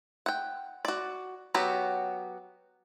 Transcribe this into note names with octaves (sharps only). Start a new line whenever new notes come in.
F#5 G5
F#4 D5
F#3 B3 F#4 G4